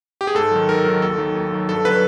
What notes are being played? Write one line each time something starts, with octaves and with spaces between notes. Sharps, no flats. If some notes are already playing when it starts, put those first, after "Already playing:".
G4
G#4
G#2 A4
D#3 F#3
G#2 A#4
D#3 F#3
D#2 A4
D#3 F#3
D#2
D#3 F#3
G2 A4
D3 F#3 B4